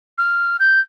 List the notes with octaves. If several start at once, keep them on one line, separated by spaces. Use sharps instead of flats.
F6
G6